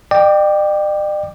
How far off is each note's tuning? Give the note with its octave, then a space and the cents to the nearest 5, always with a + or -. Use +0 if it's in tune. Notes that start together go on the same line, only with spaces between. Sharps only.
D5 +45 G5 +0 D6 -5